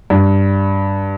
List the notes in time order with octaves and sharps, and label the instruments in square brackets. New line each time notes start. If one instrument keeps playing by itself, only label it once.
[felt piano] G2